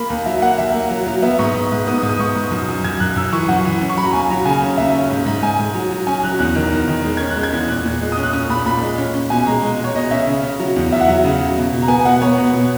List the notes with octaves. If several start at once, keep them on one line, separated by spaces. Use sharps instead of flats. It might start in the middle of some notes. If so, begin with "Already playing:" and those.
Already playing: A#3 B5
D#2
F#3 E5
A#3 F#5
D#2 E5
A#3
F#3
F#3
B3 E5
G#2 C#6
G#2
G#2
B3 D#6
D#6
G#2
D#6
G#2 C#6
G#2
F#2
F#2
F#2 G#6
F#2 F#6
F#2 E6
E3 C#6
F#2 F#5
E3
C#4
C#6
F#3 B5
A#5
D#2 G#5
F#3 A#5
C#3 G#5
C#4
D#2 E5
C#4
G#2
G#2
G#2 G#5
G#2
F#3
F#3
C#4 G#5
F#3 F#6
E2 F#6
D#3
E2
D#3
G#3
C#4 G#6
F#6
G#3
G#6
E2
A#2 F#6
A#2
G#3
D#6
C#4
F#6
C#4 D#6
A#2 B5
A#2 B5
G#3
C#4
C#4
B2 G#5
G#3 A#5
G#3
B2 C#5
B2 D#5
C#4 E5
C#3
C#4
F#3
E2
E2 E5
F#5
F#3 E5
C#3
F#3
B2
B2
A#5
B3 G#5
B2 F#5
B3 C#5
B2
B2